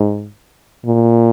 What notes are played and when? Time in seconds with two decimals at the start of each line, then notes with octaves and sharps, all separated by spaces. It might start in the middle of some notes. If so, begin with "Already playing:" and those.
Already playing: G#2
0.85 A#2